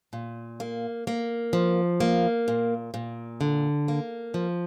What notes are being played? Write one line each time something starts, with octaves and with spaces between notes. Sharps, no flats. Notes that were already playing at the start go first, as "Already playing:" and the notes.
A#2
A#3
A#3
F3
A#3
A#2
A#2
D3
A#3
F3